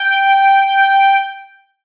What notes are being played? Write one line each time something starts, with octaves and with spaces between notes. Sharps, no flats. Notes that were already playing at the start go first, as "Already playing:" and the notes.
Already playing: G5